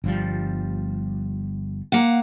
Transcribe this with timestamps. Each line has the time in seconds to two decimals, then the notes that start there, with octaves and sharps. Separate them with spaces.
0.04 G1 F3 G3
1.92 A#3 F5 F#5